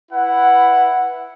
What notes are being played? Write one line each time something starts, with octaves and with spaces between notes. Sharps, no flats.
E4 B4 F#5